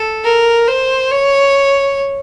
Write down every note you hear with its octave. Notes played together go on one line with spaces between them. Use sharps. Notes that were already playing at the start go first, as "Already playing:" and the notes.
Already playing: A4
A#4
C5
C#5